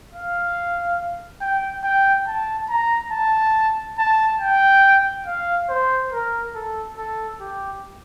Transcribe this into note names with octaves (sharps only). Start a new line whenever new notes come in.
F5
G5
G5
A5
A#5
A5
A5
G5
F5
C5
A#4
A4
A4
G4